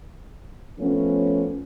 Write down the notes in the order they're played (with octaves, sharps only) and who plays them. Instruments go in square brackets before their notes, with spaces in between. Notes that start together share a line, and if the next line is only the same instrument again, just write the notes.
[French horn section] F3 A3 B3 C#4